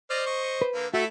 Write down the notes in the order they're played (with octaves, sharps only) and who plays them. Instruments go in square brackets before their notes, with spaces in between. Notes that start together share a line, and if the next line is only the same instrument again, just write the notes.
[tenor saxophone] C5 [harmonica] D5 D#5 F6
[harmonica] D#5 C#6
[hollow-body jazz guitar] B4
[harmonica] D3 A#3
[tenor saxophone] A3 [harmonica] E4 A4 E5 [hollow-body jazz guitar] F#4